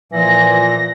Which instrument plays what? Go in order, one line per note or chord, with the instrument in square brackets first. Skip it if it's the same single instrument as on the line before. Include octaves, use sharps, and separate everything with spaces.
[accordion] A#2 [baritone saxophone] E3 [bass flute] F3 [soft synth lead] A#6